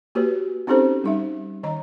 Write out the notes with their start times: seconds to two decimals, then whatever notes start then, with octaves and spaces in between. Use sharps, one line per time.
0.15 A#3 F#4 G4 B4 C#5
0.67 C4 C#4 D#4 G4 A4 C5
1.04 G3 D#4 E5
1.63 D#3 D#5 A#5